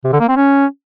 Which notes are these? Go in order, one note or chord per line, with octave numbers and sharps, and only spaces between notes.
C3
D3
A#3
C4
C#4